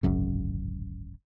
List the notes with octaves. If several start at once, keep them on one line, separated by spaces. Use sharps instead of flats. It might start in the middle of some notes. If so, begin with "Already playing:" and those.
D1 G#1 F#2 C#3